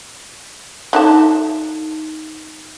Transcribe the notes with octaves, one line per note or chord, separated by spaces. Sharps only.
D3 F#3 D#4 E5 F5 A5